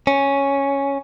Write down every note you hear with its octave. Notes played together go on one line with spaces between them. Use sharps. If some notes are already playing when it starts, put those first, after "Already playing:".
C#4